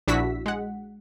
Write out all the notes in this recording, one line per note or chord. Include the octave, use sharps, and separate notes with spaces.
A#1 D4 E4 F#4 E6 B6
G#3 F#5